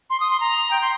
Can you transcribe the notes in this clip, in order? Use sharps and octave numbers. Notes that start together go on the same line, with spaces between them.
C6
D#6
C6
A#5
G5
C6